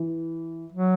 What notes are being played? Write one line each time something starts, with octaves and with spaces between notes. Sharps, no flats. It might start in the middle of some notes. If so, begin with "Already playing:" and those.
Already playing: E3
F#3